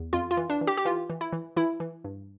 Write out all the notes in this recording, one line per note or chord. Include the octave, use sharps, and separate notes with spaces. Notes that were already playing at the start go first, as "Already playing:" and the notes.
Already playing: E2
F2 F4
F4
E3
D4
E3
G4
G4
E3 F4
E3
E4
E3
E3 E4
E3
G2